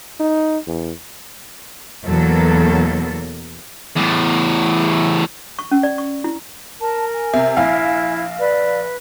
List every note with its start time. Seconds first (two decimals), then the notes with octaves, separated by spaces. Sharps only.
0.20 D#4
0.67 E2
2.06 E2 B2 F#3 A#3 A4
3.96 E2 A2
5.59 C#6
5.71 C#4
5.83 D5
5.98 C#6
6.24 E4
6.80 A#4 A5
7.14 G#5
7.34 C3 E5
7.57 A#1 E4 F5
8.39 B4 D5